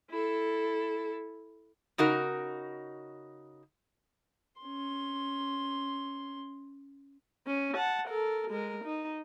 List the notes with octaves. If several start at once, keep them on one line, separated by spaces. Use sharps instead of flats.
E4 A4
C#3 D#4 F#4 A#4
C#4 C6
C#4
F#5 A5
A4 A#4
G#3 A#4
D#4